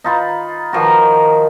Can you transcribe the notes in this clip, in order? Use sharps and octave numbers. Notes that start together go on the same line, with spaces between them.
D#4 F4 B5
D#3 F3 F#4